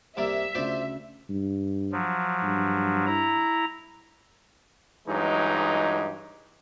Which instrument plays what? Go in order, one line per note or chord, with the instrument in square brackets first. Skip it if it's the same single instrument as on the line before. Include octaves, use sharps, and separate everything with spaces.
[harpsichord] C2 A#3 D5 [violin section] E5
[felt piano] D2 C#3 [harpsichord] F4 C5 D5
[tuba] G2
[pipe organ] F3 F#3
[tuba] G2
[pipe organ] E4 A#5
[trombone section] G2 E3 F#3 G#3 D#4